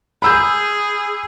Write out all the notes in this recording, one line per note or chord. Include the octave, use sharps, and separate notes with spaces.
G#4 B5 E6 G6